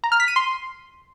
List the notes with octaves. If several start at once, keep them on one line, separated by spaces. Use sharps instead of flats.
A#5
F6
B6
D#7
C6